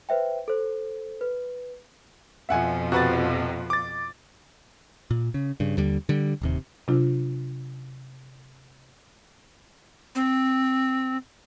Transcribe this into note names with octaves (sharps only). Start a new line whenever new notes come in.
B4 C5 E5 G5
A4 C5
B4
F2 B2 F3 E5 F#5 G#5
C3 F#4 B4 A6
D6 A6
A#2
C#3
G2 C#3
D#2 D3 G3
D3 G3
D1 D#2 C3
C3 F#3 D4 F4
C4